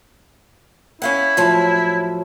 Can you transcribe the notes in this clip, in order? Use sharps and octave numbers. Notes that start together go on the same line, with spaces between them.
C#4 E4 F5 F#5
A2 F3 F#3